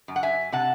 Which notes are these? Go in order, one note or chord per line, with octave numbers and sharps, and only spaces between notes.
F#2
F#5
E5 G#5
C3 F#5 A5